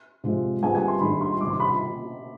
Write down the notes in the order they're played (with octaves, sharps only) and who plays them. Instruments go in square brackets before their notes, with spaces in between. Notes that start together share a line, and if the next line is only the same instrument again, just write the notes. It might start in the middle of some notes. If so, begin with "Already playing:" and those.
[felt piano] C3 F3 G#3
[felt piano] G3 C4 F4 G#4 B4 [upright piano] G#5
[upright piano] G#5
C6
[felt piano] D#3 G3 D4 G#4 D5 [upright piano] B5
[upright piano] C6
[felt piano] C3 D#3 G3 [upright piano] D6
[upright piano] C6
B5